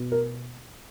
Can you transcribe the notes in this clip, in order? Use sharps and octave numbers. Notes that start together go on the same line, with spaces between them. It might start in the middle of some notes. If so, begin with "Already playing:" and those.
Already playing: B2
A#4